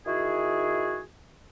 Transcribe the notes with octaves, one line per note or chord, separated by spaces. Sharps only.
D#3 E4 F#4 G#4